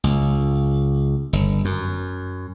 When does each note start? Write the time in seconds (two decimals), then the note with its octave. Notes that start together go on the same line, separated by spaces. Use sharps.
0.04 C#2
1.33 G1
1.65 F#2